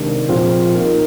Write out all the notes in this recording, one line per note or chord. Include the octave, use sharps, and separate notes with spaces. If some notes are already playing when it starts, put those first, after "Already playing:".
Already playing: C3 D#3 G#3 D4
A#2 F3 C4 F4 G#4
A#3 D#4 A#4